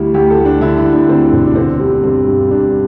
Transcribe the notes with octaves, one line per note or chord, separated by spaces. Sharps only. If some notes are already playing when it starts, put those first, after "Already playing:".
Already playing: D2 G3 E4
D2 G4
A4
G3
D4
D3 E4
E4
D2
D4
D2 C4
E1
D4
D3 C4
G3
G2 C4
G2
G2 D4